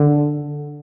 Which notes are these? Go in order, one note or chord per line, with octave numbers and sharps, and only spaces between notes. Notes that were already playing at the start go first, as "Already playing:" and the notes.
Already playing: D3